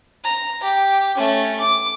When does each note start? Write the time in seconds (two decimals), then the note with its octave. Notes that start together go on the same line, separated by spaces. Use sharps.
0.24 A#5
0.63 G4
1.17 A3 C#4
1.60 D6